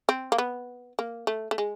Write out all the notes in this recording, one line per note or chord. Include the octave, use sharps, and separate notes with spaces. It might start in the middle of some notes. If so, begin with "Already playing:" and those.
C4
A#3
B3
A#3
A3
A3
G#3